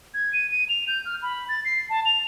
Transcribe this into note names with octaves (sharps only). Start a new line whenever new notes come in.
G#6
D#7
D#7
F7
G6
F6
B5
A6
C7
A5
F7